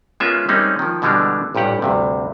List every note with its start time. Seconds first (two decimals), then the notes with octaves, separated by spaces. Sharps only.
0.20 G#3 A#3 B3 C#4 F4 E5
0.49 G3 G#3 A#3 C4 C#4 D#4
0.79 D#3 F3
1.02 B2 D3 E3 G3 G#3 D4
1.55 A1 G2 A#2 G4 F#5
1.82 D2 G2 C3